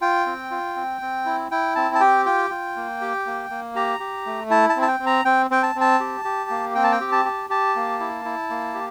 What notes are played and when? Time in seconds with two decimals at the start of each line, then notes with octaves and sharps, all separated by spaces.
0.01 F4 G5
0.26 C4
0.51 F4
0.76 C4
1.01 C4
1.26 E4
1.51 E4 G5
1.75 C4 A5
1.95 A5
2.00 G4 G5
2.25 F4 G5
2.50 F4
2.76 A#3
3.01 G4
3.26 A#3
3.50 A#3
3.75 G4 A#5
4.00 G4
4.26 A3
4.50 E4 A5
4.69 A5
4.76 C4
4.82 A5
4.88 G5
5.00 C4
5.06 A#5
5.25 C4 G5
5.51 C4 G5
5.63 A5
5.75 C4
5.81 A5
6.00 G4
6.25 G4
6.50 A#3
6.75 C4 G5
6.84 A5
6.92 G5
7.01 G4
7.12 A5
7.25 G4
7.50 G4 A5
7.76 A#3
8.00 E4
8.25 E4
8.50 A#3
8.74 G4